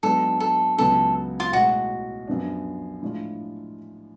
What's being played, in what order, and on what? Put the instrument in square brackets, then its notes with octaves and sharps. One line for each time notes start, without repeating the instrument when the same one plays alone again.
[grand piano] G#2 F#3 B3 D4 [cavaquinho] A4
[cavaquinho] A4
[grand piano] C#2 C#3 F#3 B3 [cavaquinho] A4
[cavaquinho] F4
[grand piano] B1 A2 G#3 [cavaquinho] F#4
[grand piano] F#2 F3 B3 D4
A2 F3 G#3 D4 F4